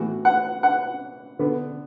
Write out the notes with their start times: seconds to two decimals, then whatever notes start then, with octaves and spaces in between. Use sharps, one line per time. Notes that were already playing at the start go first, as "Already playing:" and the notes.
Already playing: A2 E3 B3 F#4
0.25 F#5
0.63 F#5
1.39 D3 B3